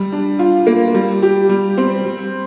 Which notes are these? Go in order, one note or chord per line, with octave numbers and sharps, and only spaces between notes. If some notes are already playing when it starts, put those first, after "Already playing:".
Already playing: G3
D4
F4
A#3
G3
G4
G3
C4
G3